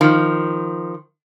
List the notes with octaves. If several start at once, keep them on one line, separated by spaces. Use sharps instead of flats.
D#3 F3